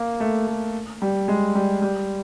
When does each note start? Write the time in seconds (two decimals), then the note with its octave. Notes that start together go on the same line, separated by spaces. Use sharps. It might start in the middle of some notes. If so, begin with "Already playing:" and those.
Already playing: A#3
0.20 A3
0.47 A3
1.02 G3
1.28 G#3
1.55 G3
1.82 G3